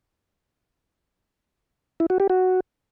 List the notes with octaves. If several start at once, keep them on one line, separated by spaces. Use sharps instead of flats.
E4
F#4
G4
F#4